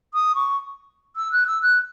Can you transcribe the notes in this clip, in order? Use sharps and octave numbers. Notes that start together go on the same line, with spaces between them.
D#6
C#6
E6
F#6
E6
F#6